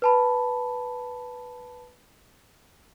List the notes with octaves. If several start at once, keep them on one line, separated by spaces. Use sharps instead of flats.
B4 A5 B5